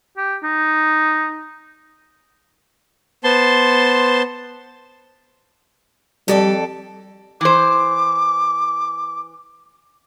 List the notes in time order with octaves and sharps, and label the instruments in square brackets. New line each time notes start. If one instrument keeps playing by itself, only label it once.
[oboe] G4
D#4
[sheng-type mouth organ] B3 C5 A5 C6
[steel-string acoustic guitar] F2 A4 D5 [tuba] G3
[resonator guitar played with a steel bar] E3 C5 [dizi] D6